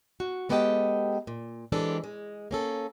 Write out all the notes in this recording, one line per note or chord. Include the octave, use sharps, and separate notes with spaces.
F#4
G#3 B3 G4 A4 D#5 G5
A#2
E3 G#3 C4 D4 G4 A4
G#3
A#3 C#4 A4